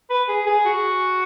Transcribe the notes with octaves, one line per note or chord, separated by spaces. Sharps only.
B4
G#4
G#4
F#4